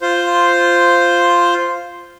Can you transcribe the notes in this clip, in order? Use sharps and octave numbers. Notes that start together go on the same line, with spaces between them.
F4 C5